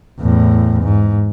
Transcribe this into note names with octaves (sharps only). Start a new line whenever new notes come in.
E2 A2
G#2